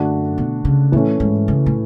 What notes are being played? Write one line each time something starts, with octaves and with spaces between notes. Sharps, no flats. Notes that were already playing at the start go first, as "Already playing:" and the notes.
Already playing: F#2 D3 A3 D4 F#4
B2
C#3
A2 E3 A3 C#4
G#2
C#3
A2